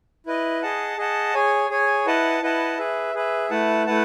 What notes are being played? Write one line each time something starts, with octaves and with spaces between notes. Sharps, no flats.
E4 B4 D#5
G#4 D#5 F#5 A5
G#4 D#5 F#5 A5
G#4 C#5 G#5
G#4 C#5 G#5
E4 B4 D#5 F#5 A5
E4 B4 D#5 F#5 A5
G#4 B4 E5
G#4 B4 E5
A3 E4 B4 F#5 A5
A3 E4 B4 F#5 A5